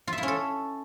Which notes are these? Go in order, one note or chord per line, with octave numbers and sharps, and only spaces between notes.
F4
E5
E4
C#4
A4